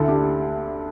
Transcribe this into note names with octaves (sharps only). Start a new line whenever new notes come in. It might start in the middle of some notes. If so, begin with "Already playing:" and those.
Already playing: D2 D3 E4 A4
D4 G4